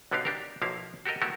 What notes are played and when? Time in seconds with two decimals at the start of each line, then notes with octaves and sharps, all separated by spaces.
0.11 B1 D3 B3 D#4 G4 F5
0.25 D4 G4 A#4
0.62 B1 F3 A#3 E4 F5
1.06 F#4 G4 A4 A#4 D#5
1.22 A3 B3 E4 F#4 G4 A#4